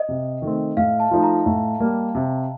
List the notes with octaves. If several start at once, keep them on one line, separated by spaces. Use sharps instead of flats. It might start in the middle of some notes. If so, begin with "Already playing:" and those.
Already playing: D#5
C3
D#3 A3 C4
A2 F5
A5
F3 A3 D#4
A#5
A2
G3 A#3
C3